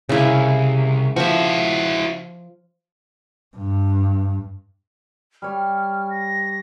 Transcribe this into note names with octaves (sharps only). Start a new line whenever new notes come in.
C2 C#3 E4
F3 E4 F#4 E5
G2
G3 C#5 F6
A#6